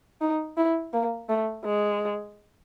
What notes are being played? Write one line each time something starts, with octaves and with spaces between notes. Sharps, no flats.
D#4
E4
A#3
A3
G#3